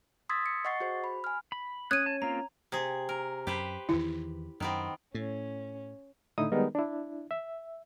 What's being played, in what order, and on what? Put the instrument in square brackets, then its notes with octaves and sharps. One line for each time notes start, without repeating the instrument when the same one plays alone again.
[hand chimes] C6 D#6 E6 G#6 A6 B6
C#7
D#5 F#5 C#6 A6 C7
F#4 G#4 C5
B5
G#5 F6
[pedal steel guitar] B5
[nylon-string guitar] C#4 [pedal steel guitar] D#6 F#6 [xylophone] G#6 D#7
[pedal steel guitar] A5
[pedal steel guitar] A#3 C4 F4 [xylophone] A#5
[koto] C3 G#4
A#4
[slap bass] F#2 [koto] G4 B4 C5
[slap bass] E2 D#3 E3 [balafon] E4
[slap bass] F#2 [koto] D#3 B3 C4
[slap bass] A2 [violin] C#4
[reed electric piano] A2 D3 D#4 E4 D#6
D#3 G3 G#3 B3 D#4 A#4
D4 E4
E5